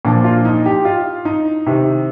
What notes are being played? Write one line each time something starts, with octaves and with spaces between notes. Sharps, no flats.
A#2 F3 D4
F4
D#4
G4
F4
D#4
C3 D#3